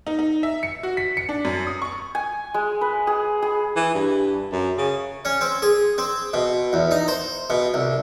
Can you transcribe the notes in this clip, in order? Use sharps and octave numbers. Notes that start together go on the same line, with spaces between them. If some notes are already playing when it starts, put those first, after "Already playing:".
D#4
D#4
E5
C#7
F#4
B6
C#7
D4
F#2
D#6
C#6
G#5
G#3
B4
G#4
G#4
E3
G2
F#2
C#3
C#4
C4
G#4
C4
B2
E2
D#4
C5
B2
C2